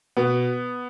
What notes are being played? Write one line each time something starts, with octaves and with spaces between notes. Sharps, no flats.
B2 B3